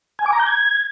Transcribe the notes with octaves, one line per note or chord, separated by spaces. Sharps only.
G#5
D6
A#5
G6
G#6